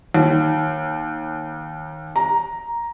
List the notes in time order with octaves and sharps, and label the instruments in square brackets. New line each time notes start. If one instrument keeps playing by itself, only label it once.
[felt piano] D#2
A#5